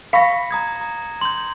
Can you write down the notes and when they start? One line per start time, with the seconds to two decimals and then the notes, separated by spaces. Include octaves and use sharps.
0.13 F5 B5 C#6 A#6 C#7
0.51 A#5 D#6 G#6
0.81 A#5
1.21 C6 G6